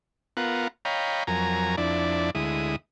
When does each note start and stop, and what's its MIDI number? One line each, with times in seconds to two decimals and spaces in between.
0.37 0.68 59
0.37 0.68 65
0.37 0.68 70
0.37 0.68 78
0.85 1.24 73
0.85 1.24 75
0.85 1.24 77
0.85 1.24 79
0.85 1.24 82
0.85 1.24 83
1.27 1.76 41
1.27 1.76 54
1.27 1.76 70
1.27 1.76 80
1.27 1.76 82
1.78 2.30 41
1.78 2.30 62
1.78 2.30 64
1.78 2.30 74
2.35 2.76 38
2.35 2.76 56
2.35 2.76 64
2.35 2.76 87